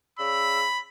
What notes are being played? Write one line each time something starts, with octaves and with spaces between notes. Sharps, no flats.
C#3 D5 B5 E6